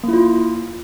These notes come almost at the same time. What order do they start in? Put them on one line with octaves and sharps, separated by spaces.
A#3 E4 F4